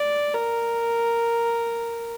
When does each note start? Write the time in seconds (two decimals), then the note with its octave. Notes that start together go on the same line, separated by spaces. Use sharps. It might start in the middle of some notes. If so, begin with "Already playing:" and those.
Already playing: D5
0.34 A#4